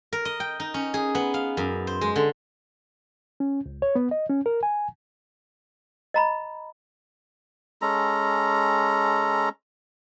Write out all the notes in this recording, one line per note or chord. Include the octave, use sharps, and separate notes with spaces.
A#4
D#5
G5
D#4
C#4
G#4
B3
F5
F#2
C5
G#3
D3
C#4
C#2
C#5
B3
D#5
C#4
A#4
G#5
D#5 A#5 B5
G#3 C#4 A4 A#5